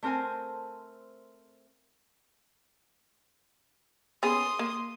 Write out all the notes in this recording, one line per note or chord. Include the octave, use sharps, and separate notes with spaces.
A3 C4 A#4 C5 G#5
B3 C#4 G#4 C6 D#6
A#3